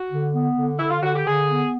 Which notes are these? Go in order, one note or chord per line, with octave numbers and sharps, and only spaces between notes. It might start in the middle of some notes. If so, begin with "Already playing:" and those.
Already playing: F#4
D3
B3
D3
D3 E4
F4
D3 F#4
G4
D3 G#4
B3